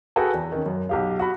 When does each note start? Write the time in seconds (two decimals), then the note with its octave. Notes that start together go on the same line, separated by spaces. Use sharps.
0.16 F#4 G#4 A4 B4 G5 G#5
0.34 E2
0.52 D#3 C#4
0.66 F#2
0.89 B1 G4 F5
1.19 F#4 B5